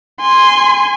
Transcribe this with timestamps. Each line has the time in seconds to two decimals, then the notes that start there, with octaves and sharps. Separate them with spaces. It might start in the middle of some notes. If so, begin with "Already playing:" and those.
0.21 G#5 C6